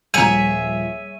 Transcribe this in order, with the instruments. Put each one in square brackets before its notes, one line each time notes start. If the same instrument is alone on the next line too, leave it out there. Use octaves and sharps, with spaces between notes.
[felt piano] D#1 F3 [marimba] G3 A#5 [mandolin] G#4 C#5 E5 [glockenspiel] D#7